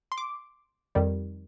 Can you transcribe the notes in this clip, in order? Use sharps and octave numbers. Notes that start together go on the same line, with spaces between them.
C6
D6
F2 D#3 G3